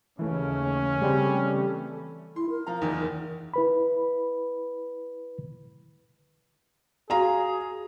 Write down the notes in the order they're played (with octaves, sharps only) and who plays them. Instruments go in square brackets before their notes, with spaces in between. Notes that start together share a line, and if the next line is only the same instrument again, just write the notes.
[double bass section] D#2 C#3 [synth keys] E3 A3 [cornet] C#4
[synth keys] C#3 C4 [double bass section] E3 A3 [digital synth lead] G3
[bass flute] E4 [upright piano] C6
[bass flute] A#4
[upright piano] F3 F5 A#5
F#1 E2 D#3
[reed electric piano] E4 B4 B5
[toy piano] F4 F#4 [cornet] G#4 [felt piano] F5 A#5